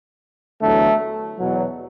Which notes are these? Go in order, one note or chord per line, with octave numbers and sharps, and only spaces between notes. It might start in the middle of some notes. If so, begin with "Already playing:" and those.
E2 D3 F#3 A3
E2 B2 F#3